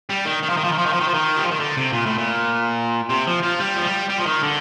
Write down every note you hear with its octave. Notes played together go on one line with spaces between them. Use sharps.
G3
D#3
D#3
F3
D#3
F3
D#3
F3
D#3
F3
D#3
F3
D#3
G3
F3
D#3
D3
C3
A#2
A2
A#2
C3
F3
F3
G3
F3
G3
G3
F3
D#3
D3